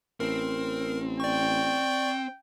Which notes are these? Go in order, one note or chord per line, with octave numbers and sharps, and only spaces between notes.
A1 C4 A#4
D5 G5 C#6